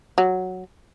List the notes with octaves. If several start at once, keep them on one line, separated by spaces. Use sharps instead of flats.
F#3